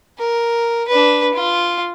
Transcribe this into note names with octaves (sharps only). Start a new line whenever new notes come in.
A#4
D4 B4
F4